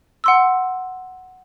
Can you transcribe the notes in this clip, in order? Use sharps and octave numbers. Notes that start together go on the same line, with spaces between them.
F#5 C6 E6